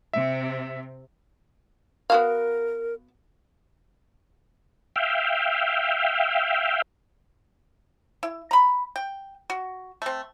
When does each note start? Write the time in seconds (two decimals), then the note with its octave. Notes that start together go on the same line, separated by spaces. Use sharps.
0.13 C3 E5
2.10 B3 F#4 A#4 F5
4.96 E5 F5 G5
8.23 E4
8.51 A#5 B5
8.96 G5
9.50 F#4
10.02 A3 C4